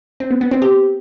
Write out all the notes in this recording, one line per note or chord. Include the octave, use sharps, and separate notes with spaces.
C4
B3
B3
C4
G4